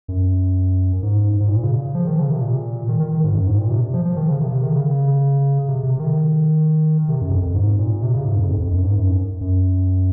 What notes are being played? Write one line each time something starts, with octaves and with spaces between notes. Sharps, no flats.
F#2
G#2
G#2
A#2
C#3
F3
D#3
C#3
C3
A#2
D#3
D#3
D#3
G#2
F#2
G#2
A#2
C3
F3
F3
D#3
C#3
C3
C3
D#3
C#3
C3
C3
D#3
C3
F#2
F2
G#2
A#2
C3
C#3
G#2
F2
F2
F2
F#2
G#2
F#2
F#2